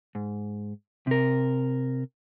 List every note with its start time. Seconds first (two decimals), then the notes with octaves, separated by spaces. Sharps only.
0.15 G#2
1.07 C3 A#4